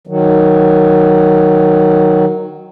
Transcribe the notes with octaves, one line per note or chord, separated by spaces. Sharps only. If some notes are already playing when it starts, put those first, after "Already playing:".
D#3 F#3